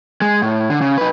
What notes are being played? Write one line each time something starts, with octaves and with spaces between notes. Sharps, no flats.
G#3
A2
D3
C#3
D#4 B4